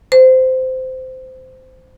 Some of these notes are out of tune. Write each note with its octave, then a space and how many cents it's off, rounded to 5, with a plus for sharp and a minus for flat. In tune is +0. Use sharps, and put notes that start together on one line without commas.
C5 -15